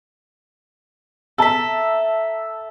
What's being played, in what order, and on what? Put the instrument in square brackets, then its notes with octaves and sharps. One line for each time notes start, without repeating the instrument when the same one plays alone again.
[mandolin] A4 E5 [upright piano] A5 A#5 E6